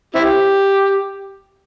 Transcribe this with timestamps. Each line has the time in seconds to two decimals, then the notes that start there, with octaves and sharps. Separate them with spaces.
0.15 C4 E4 G4